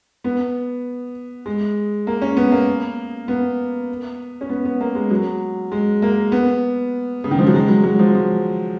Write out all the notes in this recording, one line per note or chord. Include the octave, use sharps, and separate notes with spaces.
B3
G#3
A#3
C#4
B3
A#3
B3
C#4
B3
B3
A#3
G#3
F#3
G#3
A#3
B3
C#3
D#3
F3
F#3
G#3
F#3
F#3
F3
F3